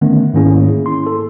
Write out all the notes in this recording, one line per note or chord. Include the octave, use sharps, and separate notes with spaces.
D3 D#3 A3 B3 C#4
G#2 D#3 A#3 C#4 E4 G#4
C6
A4